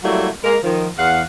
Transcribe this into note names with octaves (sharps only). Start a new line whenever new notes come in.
F#3 G3 A3 A#3 E4 F#4
G#3 A#3 A#4
D#3 F3
E2 F5 F#5